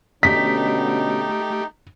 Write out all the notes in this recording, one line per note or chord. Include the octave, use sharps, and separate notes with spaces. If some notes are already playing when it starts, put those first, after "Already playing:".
B2 D3 A3 C#4 D#4 G4 B6